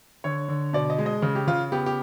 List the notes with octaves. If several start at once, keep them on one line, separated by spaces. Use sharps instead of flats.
D3 C#5
D3
B2 D5
D#5
G#3
D#5
C#3
G4
C#3 F4
B3 G4
G4